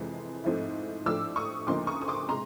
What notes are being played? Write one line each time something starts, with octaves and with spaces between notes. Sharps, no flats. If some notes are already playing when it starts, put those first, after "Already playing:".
Already playing: F2 C3 E3 G#3
G#2 F3 A3 C4 E4
A2 F3 A3 D4 D6 E6
C#6 D#6
D2 C#3 F3 A#3 D#4 C6 D6
C#6 D#6
D#6
C6 D6
C3 G#3 A#5 C6